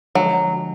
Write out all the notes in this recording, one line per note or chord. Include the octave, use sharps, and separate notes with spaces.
D3 F3 F#3 G#3 D4 F#4